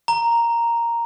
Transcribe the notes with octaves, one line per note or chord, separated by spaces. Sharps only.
A#5